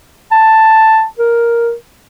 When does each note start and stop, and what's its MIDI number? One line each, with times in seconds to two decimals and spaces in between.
0.32 1.05 81
1.19 1.73 70